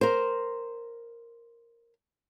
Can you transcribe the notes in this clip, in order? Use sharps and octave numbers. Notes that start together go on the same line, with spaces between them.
A#4 C5